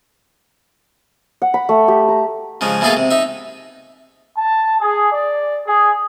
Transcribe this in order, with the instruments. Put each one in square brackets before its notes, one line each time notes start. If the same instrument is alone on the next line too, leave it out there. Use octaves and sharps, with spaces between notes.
[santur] F#5
B5
A3
G4
A#5
[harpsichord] C#3 F3 G#3
B2 E3 A#3 G#4 A4 F5
C3
D#4 E5
[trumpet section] A5
G#4
D5
G#4